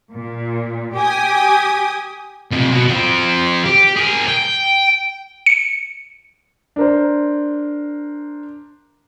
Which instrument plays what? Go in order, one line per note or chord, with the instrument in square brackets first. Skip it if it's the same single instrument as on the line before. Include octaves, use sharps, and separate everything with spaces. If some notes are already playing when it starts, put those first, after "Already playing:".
[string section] A#2
G4 G5 G#5 D#6
[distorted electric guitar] F2 C3
B2
F3 C4
G4
G#4 A#4
G5
[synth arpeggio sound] C#7
[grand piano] D4 A#4 C5